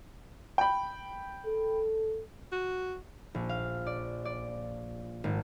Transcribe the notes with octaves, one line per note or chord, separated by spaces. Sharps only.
G5 B5
A4
F#4
A#1
F5
D5
D5
G#1